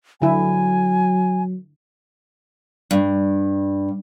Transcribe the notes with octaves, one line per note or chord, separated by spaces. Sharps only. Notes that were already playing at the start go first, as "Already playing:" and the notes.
D3 F#3 E4 G#5
G2